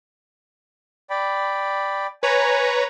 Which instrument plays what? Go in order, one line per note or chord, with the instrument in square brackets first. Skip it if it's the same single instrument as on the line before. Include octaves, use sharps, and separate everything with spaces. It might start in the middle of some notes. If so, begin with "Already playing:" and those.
[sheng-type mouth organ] D5 G5 B5
[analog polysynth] B4 C#5 A#5 [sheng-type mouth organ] G#5